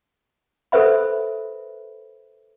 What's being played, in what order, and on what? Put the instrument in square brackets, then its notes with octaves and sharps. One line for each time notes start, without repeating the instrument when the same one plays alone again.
[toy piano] A4 B4 C5 E5 B5